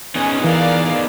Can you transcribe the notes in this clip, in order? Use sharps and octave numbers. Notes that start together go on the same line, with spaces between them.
B3 C#4 D#4 G#4
E3 A#4 D5 F5